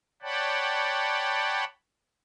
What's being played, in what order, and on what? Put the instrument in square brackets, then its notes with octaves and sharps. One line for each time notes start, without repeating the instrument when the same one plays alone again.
[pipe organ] C#5 D5 F#5 G5 A5 B5